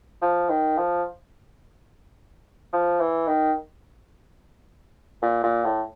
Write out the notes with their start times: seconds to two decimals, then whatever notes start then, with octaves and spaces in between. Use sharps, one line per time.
0.22 F3
0.50 D#3
0.78 F3
2.73 F3
3.00 E3
3.28 D#3
5.22 A#2
5.44 A#2
5.65 A2